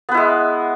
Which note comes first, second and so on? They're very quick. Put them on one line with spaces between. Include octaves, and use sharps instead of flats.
B3 B4 E4 G#3